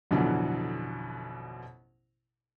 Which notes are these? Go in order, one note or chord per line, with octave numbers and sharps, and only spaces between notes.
A1 F2 B2 D3 E3 F#3